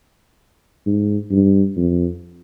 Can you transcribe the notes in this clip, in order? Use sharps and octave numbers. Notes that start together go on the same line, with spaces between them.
G#2
G2
F2